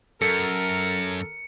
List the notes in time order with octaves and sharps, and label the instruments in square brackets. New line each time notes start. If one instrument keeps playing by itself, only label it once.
[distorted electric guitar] F#2 [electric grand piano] A4 [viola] A#4 [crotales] C#7